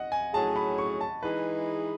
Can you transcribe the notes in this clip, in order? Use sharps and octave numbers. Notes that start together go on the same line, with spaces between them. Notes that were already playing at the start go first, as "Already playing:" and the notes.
Already playing: D#5 F#5
G#5
A2 F#3 C#4 G#4 A5
B5
C#6
A5
E3 G#3 D#4 G#4 B4